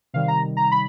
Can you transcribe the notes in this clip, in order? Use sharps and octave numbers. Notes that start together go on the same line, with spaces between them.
C3 D#3 G3 F5
A#5
A#5
B5